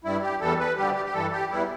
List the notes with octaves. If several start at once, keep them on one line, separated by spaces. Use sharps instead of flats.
G2 G3 E4
G4
E2 E3 G3 A4
B4
D2 D3 G3 G4
G4
G4
G2 E3 G3 A4
G4
E2 E3 G3 E4